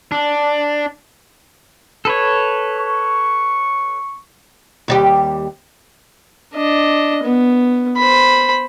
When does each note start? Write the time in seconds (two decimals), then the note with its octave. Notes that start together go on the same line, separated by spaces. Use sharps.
0.12 D4
2.05 A4 B4 C#5
2.77 C#6
4.88 D#2 G3 G4
6.54 D4 D#5
7.23 B3
7.97 C5 B5